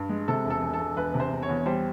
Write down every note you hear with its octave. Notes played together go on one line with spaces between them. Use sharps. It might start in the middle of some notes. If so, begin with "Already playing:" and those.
Already playing: G2
G#3
C3 A4
E1
A4
E1
A4
E1
E1 B4
C3
C5
E1
C#5
E2
G3 C5